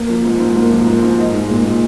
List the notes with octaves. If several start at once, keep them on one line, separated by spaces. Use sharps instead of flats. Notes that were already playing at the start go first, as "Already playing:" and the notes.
Already playing: A#3
F3
G#2
G#2
A#3
F3
G#2
G#2
D#4
G#3
A#2
A#2